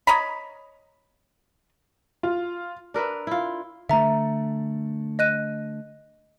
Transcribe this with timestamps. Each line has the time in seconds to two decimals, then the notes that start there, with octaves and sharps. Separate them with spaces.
0.07 C#5 D#5 A#5 B5
2.23 F4
2.94 D4 A#4 B4 E5
3.27 E4 F4
3.89 D3 A3 E5 A#5
5.19 D#5 F#6 D#7